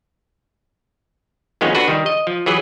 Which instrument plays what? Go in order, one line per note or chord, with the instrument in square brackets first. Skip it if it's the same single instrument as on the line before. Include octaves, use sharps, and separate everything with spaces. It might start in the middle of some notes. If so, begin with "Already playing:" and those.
[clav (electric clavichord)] D#2 D#3 F3 G#3 B3 C#4
D3 D4 F#4 B4
D#3 G3
D#5
F3
E3 F#3 G#4 B4